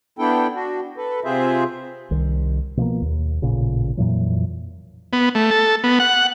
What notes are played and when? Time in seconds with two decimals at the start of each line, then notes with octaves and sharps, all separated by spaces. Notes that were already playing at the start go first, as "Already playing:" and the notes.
0.19 B3 D4 E4 A4 G5
0.54 D4 F#4
0.97 A4 B4
1.25 C3 C4 F4 G#4 C5 E5
2.11 C2 D#3
2.77 B2 F3 G3 A#3
3.02 D#2
3.42 A1 A#2 C#3
3.97 F2 A#2 E3 F#3
5.13 B3
5.35 A3
5.51 A4
5.84 B3
6.00 F#5